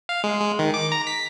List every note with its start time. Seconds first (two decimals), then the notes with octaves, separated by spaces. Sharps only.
0.09 F5
0.24 G#3
0.41 G#3
0.59 D#3
0.74 D6
0.92 A#5
1.07 B6